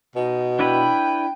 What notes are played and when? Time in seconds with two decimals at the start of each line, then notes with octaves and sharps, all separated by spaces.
0.16 B2 D#4
0.59 D4 E4 B4 G5